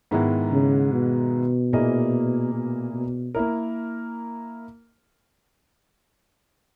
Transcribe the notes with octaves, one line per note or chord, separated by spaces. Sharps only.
G#2 D#3 G#3 B3 E4
C#3
B2
A#2 A#3 E4 G#4 D#5
B2
B2
A#3 E4 A#4